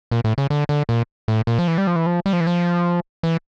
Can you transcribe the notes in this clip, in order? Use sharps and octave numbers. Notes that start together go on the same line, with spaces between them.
A#2
A2
C#3
D3
D3
A#2
A2
A#2
F3
E3
G3
F3
E3
F3
G3
F3
E3
F3
E3